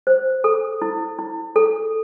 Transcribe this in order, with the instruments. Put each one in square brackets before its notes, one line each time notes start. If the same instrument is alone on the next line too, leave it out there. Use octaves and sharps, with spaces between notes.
[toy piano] C5
A4
E4
E4
A4